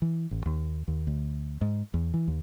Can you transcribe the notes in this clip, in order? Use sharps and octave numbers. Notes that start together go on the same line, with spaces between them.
E3
A1
D#2
D#2
D2
G#2
E2
E3
D#2